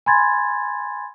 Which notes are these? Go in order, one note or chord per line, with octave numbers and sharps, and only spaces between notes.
G#5 B5 C6 G#6 A6